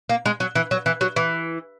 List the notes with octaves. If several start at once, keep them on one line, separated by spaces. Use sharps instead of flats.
A#3
G#3
F#3
E3
F#3
E3
F#3
E3